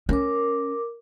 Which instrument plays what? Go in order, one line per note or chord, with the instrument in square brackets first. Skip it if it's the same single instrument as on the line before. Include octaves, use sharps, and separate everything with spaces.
[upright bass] C#4 [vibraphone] A#4 D6